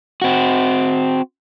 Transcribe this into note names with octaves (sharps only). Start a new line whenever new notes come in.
C4 F#4